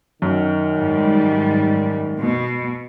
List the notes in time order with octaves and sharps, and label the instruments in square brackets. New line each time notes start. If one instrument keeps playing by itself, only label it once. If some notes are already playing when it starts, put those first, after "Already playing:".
[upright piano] F#2 [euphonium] D#3
[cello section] G#2 G3
B2